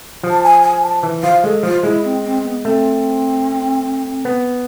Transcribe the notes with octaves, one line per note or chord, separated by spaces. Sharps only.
F3
A5
G#5
G#5
A5
E3
F3 F5
G#3 A4
F3 F4
G#3 E4
C4
C4
B3
A3 C4
B3